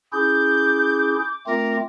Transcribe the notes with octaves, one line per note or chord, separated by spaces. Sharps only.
C#4 E4 G#4 D6 G6
A3 C4 F4 A#4